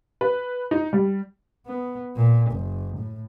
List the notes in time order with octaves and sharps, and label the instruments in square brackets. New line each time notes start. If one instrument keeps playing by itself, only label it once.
[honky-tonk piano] B4
D#4
G3
[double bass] B3
A#2
F#1
A2